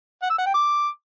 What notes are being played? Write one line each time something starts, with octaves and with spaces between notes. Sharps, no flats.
F#5
E6
F#5
G5
D6